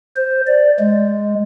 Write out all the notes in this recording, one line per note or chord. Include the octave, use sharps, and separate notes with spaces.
C5
D5
G#3